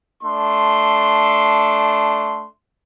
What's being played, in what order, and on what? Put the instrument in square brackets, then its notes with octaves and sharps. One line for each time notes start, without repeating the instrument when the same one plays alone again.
[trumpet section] A3 D4 C6